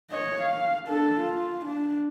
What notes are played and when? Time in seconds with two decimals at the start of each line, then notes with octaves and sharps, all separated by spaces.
0.10 C#5 D#5
0.42 F5
0.87 D4 A4
1.21 F4
1.66 D4